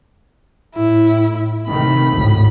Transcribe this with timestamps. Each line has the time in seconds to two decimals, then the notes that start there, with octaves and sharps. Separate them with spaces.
0.75 A2 E4
1.68 C3 D#3 A3 B5
2.15 G#1 D2 A2